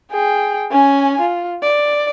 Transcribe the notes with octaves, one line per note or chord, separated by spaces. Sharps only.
G#4 G5
C#4 G#5
F4
D5